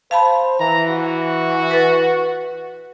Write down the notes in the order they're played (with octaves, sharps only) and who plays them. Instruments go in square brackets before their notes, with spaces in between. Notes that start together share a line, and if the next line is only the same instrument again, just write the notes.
[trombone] C5 [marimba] F5 A5 B5
[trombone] E3 [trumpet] A#5
[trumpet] F#4
[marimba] B4 A6